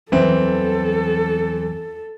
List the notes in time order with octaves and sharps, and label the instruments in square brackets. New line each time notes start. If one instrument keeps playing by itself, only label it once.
[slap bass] E2 F#3 G3 [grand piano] E3 C4 [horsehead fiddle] A4